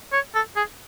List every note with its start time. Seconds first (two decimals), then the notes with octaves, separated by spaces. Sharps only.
0.13 C#5
0.35 A4
0.56 G#4